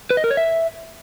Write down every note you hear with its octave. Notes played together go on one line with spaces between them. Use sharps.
B4
D#5
A#4
C#5
E5